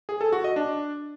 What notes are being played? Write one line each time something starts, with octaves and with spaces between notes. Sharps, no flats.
G#4
A4
F#4
D#5
D4